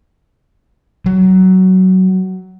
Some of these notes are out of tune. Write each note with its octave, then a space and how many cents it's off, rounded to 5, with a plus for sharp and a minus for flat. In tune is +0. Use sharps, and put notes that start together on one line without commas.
F#3 +15